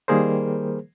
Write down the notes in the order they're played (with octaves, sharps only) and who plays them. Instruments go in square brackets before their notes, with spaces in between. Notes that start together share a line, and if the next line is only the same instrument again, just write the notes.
[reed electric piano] D#3 G3 A#3 G#4 A#4 C5